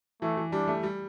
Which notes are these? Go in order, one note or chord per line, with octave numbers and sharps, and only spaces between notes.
E3 A3
E3
G3 D4
A3
G3